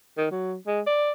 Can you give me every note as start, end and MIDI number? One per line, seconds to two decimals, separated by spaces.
0.18 0.28 51
0.31 0.55 54
0.67 0.81 56
0.87 1.12 74